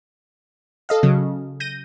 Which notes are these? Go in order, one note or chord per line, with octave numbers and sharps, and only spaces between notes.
A4 D#5 F5
C#3 F#3
G6 A#6 D#7